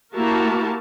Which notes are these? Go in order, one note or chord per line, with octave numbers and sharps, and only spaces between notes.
A#3 E4 F#4 G4 A#4 A5